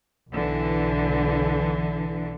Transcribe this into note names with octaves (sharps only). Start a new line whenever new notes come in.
B1 D3 E3